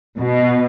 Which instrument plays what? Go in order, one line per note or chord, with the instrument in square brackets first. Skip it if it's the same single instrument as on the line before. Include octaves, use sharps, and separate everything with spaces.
[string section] B2